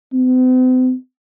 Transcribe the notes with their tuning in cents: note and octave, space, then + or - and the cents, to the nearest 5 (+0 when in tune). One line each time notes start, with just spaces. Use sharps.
C4 -45